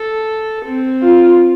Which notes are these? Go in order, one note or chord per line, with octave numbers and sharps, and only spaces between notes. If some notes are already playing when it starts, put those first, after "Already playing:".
Already playing: A4
C4
F4